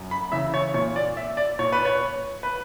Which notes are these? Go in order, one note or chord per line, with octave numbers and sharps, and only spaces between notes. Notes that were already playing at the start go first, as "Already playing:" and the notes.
Already playing: F#2
B5
C#3 E3 E5
C#5
A#2 C#5
D5
E5
D5
A#2 C#5
B4
C#5
B4